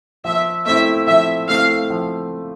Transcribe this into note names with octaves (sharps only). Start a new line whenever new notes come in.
F3 E5
A3 C4 E4 E5
F3 E5
A3 C4 E4 F5
F3